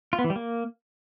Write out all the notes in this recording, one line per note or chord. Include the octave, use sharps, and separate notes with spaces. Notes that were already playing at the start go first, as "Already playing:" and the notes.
F4
B3
E3
G3
A#3